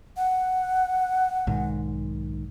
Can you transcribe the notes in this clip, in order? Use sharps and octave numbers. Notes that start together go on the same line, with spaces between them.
F#5
B1 G#2 D#3